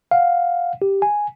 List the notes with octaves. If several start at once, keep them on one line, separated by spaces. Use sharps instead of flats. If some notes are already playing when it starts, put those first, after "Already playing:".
F5 F#5
G4
G#5